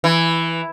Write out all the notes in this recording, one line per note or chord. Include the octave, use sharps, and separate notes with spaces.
E3